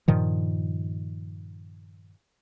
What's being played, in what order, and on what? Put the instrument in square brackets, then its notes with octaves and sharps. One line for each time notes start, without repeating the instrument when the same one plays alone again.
[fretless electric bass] G2 A#2 D#3 F3